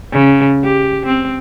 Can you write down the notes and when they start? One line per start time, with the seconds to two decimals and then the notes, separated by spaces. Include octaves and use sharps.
0.12 C#3
0.64 G4
1.06 C4